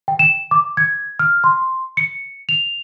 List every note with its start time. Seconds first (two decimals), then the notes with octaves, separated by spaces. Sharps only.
0.08 G5
0.19 E7
0.51 D6
0.77 G#6
1.19 F6
1.44 C6
1.97 C#7
2.49 F7